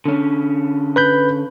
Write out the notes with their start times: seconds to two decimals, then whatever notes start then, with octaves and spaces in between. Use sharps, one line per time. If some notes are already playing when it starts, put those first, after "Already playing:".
0.05 D3 C#4
0.96 B4 B5 G6